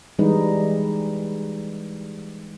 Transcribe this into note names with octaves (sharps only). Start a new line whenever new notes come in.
E3 G3 G#3 D#4 B4